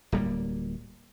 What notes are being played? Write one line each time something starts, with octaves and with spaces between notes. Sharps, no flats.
D1 G3 A#3